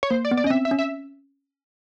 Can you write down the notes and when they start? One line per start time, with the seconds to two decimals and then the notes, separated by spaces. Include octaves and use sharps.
0.03 C#5
0.10 A#3 C5
0.25 D5
0.31 B3
0.37 D5
0.44 C#4 D#5
0.50 C4 E5
0.65 E5
0.71 C#4
0.79 E5